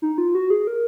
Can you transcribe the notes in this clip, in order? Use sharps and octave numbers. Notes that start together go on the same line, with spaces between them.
D#4
F4
F#4
G#4
A#4